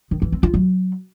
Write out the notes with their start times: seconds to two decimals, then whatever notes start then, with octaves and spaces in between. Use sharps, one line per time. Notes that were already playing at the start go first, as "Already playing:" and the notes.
0.11 D#3
0.22 E3
0.32 C4
0.43 F4
0.54 F#3